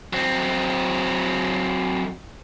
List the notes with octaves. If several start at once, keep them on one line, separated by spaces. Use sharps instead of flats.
F#3 C4